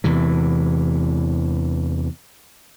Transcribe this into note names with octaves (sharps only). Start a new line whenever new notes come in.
E2 C3 E3